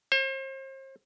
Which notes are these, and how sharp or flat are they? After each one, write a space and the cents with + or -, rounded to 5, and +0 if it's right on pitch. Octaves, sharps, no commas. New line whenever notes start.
C5 +40